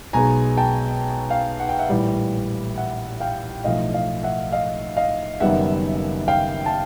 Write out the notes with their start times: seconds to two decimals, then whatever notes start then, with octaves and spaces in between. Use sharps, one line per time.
0.13 B1 B2 G#3 G#5 A#5
0.58 G5 A5
1.30 F5 G5
1.60 F#5
1.69 G5
1.79 E5 F#5
1.89 A#1 A2 E3 G3
2.78 E5 F#5
3.20 F5 G5
3.64 B1 A2 F3 A3 D#5 F5
3.94 D#5 F5
4.23 E5 F#5
4.52 D#5 F5
4.97 D#5 F5
5.40 F#1 F#2 D#3 G3 B3 E5 F#5
6.28 F5 G5
6.66 A5